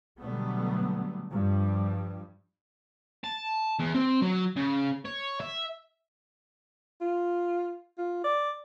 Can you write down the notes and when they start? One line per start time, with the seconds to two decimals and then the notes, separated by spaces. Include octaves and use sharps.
0.20 B2 D3 F#3 G3 A3 B3
1.31 G2 F3 G3
3.24 A5
3.80 E2
3.95 C4
4.22 F#3
4.57 C#3
5.05 C#5
5.40 E5
7.01 F4
7.98 F4
8.24 D5